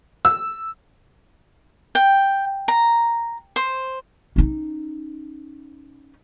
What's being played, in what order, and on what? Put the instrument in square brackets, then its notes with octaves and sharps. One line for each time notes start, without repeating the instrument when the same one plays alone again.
[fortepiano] E6
[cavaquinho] G5
A#5
C5
[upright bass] C#4 D#4